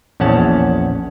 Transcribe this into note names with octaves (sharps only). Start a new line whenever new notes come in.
A#1 E2 C#4 F#5 A5